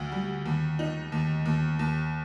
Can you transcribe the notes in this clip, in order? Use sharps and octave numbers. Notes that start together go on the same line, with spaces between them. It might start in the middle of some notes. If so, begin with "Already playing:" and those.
Already playing: D2
G3
D#2
D#4
D#2
D#2
D#2